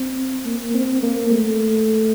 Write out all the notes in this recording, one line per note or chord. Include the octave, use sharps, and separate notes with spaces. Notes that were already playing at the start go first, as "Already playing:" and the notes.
Already playing: C4
A#3
C4
A#3
A3